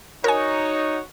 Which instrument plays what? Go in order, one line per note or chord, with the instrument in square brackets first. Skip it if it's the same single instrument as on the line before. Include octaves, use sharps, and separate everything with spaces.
[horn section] D#4 [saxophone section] F#4 C#5 [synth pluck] A#4 G#5